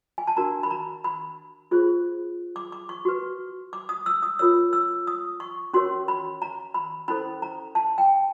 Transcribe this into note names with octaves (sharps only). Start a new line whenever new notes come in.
G#5
A5
D4 F#4 A#4 A#5
B5
A#5
B5
F4 G#4 C5
D6
D6
C#6
F#4 B4
D6
D#6
E6
D#6
F4 A#4 C#5 E6
E6
D#6
C#6
C#4 F#4 A#4 C#5 C6
B5
A#5
B5
C#4 E4 A4 C5 B5
A#5
A5
G5